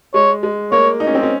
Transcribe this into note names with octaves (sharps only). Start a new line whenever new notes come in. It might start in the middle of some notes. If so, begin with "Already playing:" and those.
G#3 C#5
G#3
A#3 C#5
D#4
C#4
C4
C#4